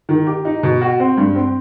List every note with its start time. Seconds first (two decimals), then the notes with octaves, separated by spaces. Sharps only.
0.09 D#3
0.27 G4
0.45 D#4
0.63 B2
0.81 F#4
1.00 C4
1.17 G2
1.35 C4